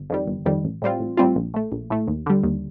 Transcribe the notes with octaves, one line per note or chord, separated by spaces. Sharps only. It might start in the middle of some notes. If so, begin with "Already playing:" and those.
Already playing: G1
F2 D#3 G3
G1
F2 D#3 G3
A1
A2 G3 C4 F4
A1
A2 G3 C4 F4
A#1
A2 A3
A#1
A2 A3
D#2
D3 G3
D#2